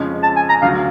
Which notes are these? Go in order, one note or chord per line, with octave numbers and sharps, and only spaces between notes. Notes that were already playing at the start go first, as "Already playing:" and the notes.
Already playing: F2 C#3 F3 G#3 C#4
A5
G#5
A#5
D2 C#3 F#3 F5